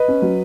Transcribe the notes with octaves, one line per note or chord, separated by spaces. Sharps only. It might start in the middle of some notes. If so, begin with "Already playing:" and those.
Already playing: B4 D#5
C#4
F#3